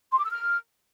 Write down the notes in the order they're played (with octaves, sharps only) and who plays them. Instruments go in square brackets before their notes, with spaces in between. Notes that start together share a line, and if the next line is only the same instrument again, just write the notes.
[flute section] C6
D6
E6
F6